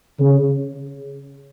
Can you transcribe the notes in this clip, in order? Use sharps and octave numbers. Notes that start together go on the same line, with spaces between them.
C#3